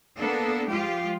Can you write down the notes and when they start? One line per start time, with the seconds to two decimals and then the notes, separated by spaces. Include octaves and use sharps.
0.19 A#3 B3 D4 A4
0.69 F3 G#3 F4 G4